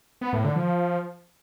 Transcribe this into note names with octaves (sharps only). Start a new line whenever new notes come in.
B3
A2
D3
F3